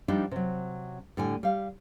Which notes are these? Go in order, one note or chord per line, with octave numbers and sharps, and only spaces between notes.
F3 G3 D4 D#4
C3 F#3
A2 D3 G3 G#5
G3 F5